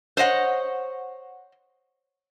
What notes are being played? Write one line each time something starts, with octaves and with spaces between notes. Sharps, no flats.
C5 C#5 D#5 F#5